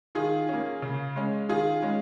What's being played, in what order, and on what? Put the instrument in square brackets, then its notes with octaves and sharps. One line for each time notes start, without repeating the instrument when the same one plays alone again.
[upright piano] D#3 F4 G#4
A#3 C#4
C#3
G#3 C#4
D#3 F4 G#4
G#3 C#4